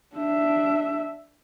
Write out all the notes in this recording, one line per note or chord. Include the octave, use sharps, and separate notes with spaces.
D4 E5